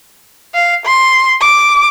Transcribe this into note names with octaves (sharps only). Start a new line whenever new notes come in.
F5
C6
D6